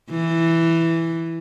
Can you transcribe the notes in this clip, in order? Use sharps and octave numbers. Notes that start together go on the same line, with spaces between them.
E3